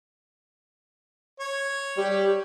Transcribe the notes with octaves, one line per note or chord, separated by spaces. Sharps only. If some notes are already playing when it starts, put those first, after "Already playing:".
C#5
G3 G4